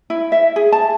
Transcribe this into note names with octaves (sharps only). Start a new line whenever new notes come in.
E4
E5
G#4
A5